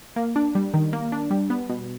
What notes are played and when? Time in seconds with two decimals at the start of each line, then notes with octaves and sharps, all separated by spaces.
0.16 A#3
0.36 D4
0.55 G3
0.74 D#3
0.93 A#3
1.12 D4
1.31 G3
1.50 B3
1.69 B2